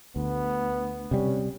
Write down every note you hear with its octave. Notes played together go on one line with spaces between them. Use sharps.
D2 B3
C3 G3 C#4